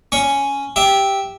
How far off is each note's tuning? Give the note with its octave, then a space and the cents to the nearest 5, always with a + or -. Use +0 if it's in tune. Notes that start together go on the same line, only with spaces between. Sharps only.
C#4 +0 C#6 +0
G4 +0 E5 -10